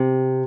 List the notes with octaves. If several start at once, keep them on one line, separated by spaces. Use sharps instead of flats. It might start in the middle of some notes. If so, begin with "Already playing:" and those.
Already playing: C3